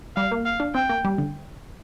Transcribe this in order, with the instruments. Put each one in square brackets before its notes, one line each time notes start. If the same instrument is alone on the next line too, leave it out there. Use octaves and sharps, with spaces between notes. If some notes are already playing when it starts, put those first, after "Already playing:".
[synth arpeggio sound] G3 [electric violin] F5
[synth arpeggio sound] A#3
[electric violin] F5
[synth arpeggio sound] D4
[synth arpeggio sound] C4 [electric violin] G5
[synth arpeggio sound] A#3
G3
D3